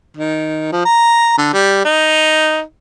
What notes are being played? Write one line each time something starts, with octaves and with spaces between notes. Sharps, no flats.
D#3
F3
A#5
D3
G3
D#4